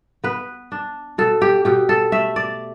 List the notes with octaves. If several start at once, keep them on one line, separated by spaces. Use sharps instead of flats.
B3 B4
D4
B2 A4
G4
B2 G4
A4
A3 E5
D5